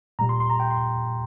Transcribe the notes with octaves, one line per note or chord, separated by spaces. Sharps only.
A#2 G3 A#5
C6
C6
A#5
G5
C6